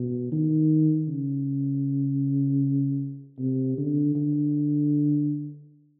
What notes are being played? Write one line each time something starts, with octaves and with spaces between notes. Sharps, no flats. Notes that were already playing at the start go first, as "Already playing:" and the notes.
Already playing: B2
D#3
C#3
C3
D3
D3